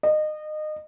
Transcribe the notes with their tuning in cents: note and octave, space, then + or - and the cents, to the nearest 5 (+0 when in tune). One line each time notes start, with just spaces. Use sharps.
D#5 -25